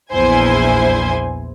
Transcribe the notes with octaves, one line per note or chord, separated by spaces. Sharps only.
A#1 E2 E4 C5 G#5